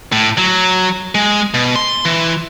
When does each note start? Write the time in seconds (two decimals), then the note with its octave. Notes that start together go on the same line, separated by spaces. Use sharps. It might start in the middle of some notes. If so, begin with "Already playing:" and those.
0.12 A2
0.38 F#3
1.15 G#3
1.54 B2
1.76 C6
2.06 E3